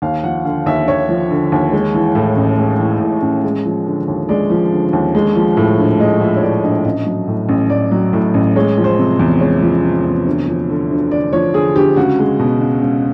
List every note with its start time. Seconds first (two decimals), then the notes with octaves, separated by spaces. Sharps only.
0.02 D#2 F5
0.24 F3 F#5
0.45 D3 F5
0.66 D#2 E5
0.88 D#2 C#5
1.09 F3
1.31 D3
1.52 D#2
1.72 G#3
1.94 E3
2.15 A2
2.36 A1
2.59 G#3
2.79 E3
3.00 A2
3.22 A1
3.44 G#3
3.65 F3
3.86 D3
4.08 D#2
4.29 G#3 D5
4.50 F3
4.71 D3
4.93 D#2
5.15 G#3
5.36 F3
5.57 A2
5.78 A#1
5.99 G#3 D#5
6.20 F3 E5
6.36 C#5
6.42 A2 D5
6.63 A#1 D#5
6.84 A1 D#5
7.06 F#3
7.28 A2
7.49 A1
7.70 A1 D5
7.91 F#3
8.13 A2
8.34 A1
8.56 G#3 C#5
8.77 F3
8.84 C5
8.99 C3
9.19 E2
9.41 G#3 C#5
9.63 F3
9.84 C3
10.05 E2
10.26 D2
10.47 F3
10.69 D3
10.91 D2
11.11 D2 D5
11.33 F3 C#5
11.54 D3 G#4
11.76 D2 G4
11.96 C#2 F#4
12.19 G#3
12.39 B2
12.61 C#2
12.83 C#2